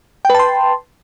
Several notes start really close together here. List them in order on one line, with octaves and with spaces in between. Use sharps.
G5 B4 A5 C6